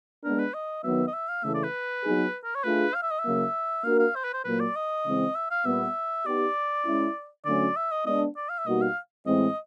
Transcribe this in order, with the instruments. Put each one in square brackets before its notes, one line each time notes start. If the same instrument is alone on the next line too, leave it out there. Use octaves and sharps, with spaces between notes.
[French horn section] G#3 B3 D4 [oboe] A#4
[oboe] B4
D#5
[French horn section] D#3 F#3 B3 [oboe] E5
[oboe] D#5
E5
F5
[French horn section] C#3 E3 A3 [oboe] E5
[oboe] D5
B4
[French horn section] F#3 B3 D#4 G#4
[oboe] A#4
C#5
[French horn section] A3 D4 F4 G#4 [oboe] B4
[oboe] F5
E5
D#5
E5
[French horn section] C#3 F#3 A#3
[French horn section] A#3 D4 F#4 A#4 [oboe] F5
[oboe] F5
C5
B4
C5
[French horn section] A#2 F#3 A#3 [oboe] B4
[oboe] D5
D#5
[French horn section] C#3 E3 G#3 C4
[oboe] E5
F5
[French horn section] A#2 G3 B3 [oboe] E5
[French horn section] B3 D#4 G4 [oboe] D5
[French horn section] G#3 C#4 E4
[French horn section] D3 F#3 A3 C#4 F#4 [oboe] D5
[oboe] E5
D#5
[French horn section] G#3 B3 D4 [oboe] D#5
[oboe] D5
F5
E5
[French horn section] B2 G3 A#3 D#4 F#4 [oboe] D#5
[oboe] F5
[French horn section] A2 E3 G#3 C4 [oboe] D#5